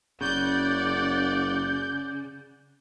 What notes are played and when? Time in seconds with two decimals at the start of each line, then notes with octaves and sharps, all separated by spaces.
0.21 F#1 C#3 D5 F#5 G6